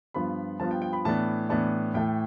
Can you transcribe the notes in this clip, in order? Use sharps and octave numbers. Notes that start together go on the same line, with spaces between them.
G2 F3 B3 F4 B5
G2 F3 B3 F4 A5
G5
G5
B5
A2 E3 B3 D4 A5
A2 E3 B3 D4 A5
A2 E3 A3 G5